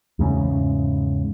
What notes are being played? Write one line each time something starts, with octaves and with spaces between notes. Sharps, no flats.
E2 G#2 C#3